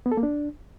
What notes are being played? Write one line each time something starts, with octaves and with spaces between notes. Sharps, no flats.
B3
A4
A#3
D4